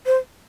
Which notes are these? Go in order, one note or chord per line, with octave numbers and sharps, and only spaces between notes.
C5